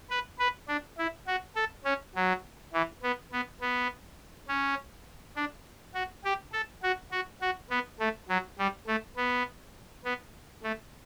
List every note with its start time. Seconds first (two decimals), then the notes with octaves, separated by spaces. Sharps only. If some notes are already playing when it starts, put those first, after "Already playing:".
0.10 B4
0.39 B4
0.68 D4
0.98 E4
1.27 F#4
1.56 A4
1.85 C#4
2.15 F#3
2.73 E3
3.03 B3
3.32 B3
3.61 B3
4.48 C#4
5.36 D4
5.94 F#4
6.24 G4
6.53 A4
6.83 F#4
7.11 F#4
7.41 F#4
7.70 B3
7.99 A3
8.28 F#3
8.58 G3
8.87 A3
9.16 B3
10.04 B3
10.63 A3